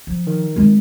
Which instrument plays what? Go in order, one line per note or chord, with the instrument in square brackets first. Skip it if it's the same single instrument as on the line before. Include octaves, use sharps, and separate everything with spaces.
[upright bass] F3
[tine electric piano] D#3
[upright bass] G#3 C4